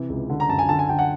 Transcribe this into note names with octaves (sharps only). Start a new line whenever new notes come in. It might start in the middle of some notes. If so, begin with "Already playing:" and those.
Already playing: C3 E3
C#2
D3
A#5
F#2 A5
G#5
D3 A5
G#5
D3 G5
F#5